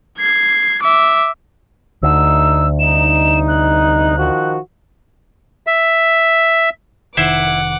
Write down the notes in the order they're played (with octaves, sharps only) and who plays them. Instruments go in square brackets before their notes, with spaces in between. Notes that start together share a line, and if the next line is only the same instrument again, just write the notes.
[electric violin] G#6 C7
E5 D6
[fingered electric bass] D2 [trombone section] A3 D#4 [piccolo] E6
[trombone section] C2 D#4 [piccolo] E7
[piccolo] F#6
[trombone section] D#3 F3 F#4
[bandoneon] E5
[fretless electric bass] F1 D#3 [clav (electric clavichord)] E4 C5 E5 [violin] F#5 D6